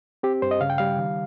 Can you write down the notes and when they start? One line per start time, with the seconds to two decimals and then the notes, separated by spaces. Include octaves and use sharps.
0.23 C4 G4
0.42 G2 C5
0.51 D#5
0.61 C#3 F5
0.70 G5
0.78 G3 F5
0.98 D#3